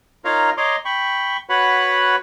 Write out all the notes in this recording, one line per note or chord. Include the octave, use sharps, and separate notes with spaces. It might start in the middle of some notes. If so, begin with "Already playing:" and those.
D#4 F4 A#4 C#5 F5 A#5
C#5 D#5 A#5 C6 D6
G5 B5 C#6
F#4 B4 C#5 F#5 B5